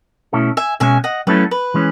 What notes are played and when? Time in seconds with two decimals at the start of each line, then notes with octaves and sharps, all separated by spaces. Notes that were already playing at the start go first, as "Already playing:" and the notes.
0.33 B2 A3 C#4 E4 A4
0.57 E5 G#5
0.80 B2 G#3 C#4 E5 G#5
1.04 D#5 F#5
1.27 F#3 A3 C#4 E4 A4 B4
1.51 B4
1.74 E3 G#3 C#4